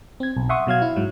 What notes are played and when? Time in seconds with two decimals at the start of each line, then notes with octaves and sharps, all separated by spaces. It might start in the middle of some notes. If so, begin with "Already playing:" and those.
0.20 C4 G#6
0.37 B1
0.49 E5 F#5 C6 C#6 D#6
0.67 B2 F#3 F5 G#6
0.82 E4
0.96 G#2 F#3